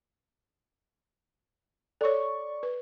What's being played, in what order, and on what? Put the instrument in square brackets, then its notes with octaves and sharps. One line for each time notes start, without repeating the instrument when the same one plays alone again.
[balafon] A4 C#5 [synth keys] D5 C#6
[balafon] B4